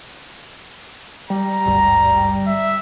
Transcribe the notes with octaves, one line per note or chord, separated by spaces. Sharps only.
G3 A#5
G#1 D2 G2
E5